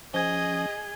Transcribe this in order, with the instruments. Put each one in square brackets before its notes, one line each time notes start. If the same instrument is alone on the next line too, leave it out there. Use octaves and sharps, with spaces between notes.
[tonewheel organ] F3 C#4 [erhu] G#4 [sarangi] D#5 [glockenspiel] G#6 G7